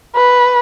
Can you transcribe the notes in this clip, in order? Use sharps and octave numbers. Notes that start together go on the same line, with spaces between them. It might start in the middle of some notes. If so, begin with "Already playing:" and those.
B4